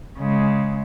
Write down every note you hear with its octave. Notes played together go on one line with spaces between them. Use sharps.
C#3 G#3